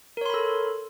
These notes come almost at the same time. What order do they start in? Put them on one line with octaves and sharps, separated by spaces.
A#4 C#5 C6 B5 A4